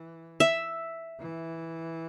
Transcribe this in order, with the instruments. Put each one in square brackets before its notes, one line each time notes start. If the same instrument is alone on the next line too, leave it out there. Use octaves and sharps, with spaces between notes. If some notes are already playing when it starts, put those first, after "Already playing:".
Already playing: [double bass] E3
[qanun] E5
[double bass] E3